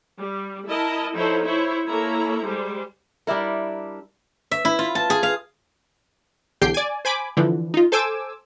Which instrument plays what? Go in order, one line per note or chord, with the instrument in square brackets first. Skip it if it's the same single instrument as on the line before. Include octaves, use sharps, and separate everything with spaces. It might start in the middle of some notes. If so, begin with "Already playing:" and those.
[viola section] G3
E4 A#4 D#5 A5
F3 D#4 E4 A4 C5 C#5
E4 C5 C#5
A#3 E4 A4 C#5 A#5
G3 G#3 C5
[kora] G3 D4 E4 A#4
[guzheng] E5
E4
F4
A5
G#4
F5
[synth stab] B1 E2 D3 G4 G5 C7
D5 G#5
C5 G#5 B5 D6
D3 E3 F3
D#4 F4
A4 C5 G#5 D6 E6